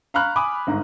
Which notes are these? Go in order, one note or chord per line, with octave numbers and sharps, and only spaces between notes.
F5 A#5 B5 C#6 F6 F#6
G#5 B5 D6 D#6
G1 G#2 A#5